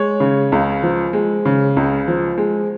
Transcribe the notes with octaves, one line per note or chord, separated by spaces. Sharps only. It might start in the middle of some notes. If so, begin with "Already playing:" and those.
Already playing: G#3 C#5
C#3
C#2
F3
G#3
C#3
C#2
F3
G#3